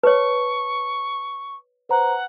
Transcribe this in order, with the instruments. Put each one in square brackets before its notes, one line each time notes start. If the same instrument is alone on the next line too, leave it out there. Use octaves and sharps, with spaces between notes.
[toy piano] B4 C#5 [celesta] A5 [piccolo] C#6
[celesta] B4 C5 A#5 [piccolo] F#5